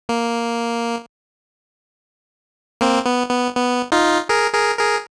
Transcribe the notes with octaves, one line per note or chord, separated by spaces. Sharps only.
A#3
A#3 C4
B3
B3
B3
D#4 F4
G#4 A#4
G#4 A#4
G#4 A#4